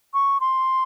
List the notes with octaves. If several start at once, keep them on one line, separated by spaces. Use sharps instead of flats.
C#6
C6